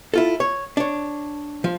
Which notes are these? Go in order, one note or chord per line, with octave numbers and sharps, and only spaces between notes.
E4 F4 A4
C#5
D4 C#5
F3